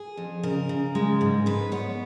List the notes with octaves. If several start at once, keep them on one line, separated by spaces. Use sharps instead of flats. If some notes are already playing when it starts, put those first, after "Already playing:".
Already playing: G#4
F2
C#3 A#4
C#3
G#3
G#2
G#2 B4
B3 C#5